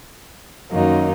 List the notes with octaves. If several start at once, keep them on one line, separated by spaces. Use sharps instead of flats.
F#2 D#3 F#3 A#3 D#4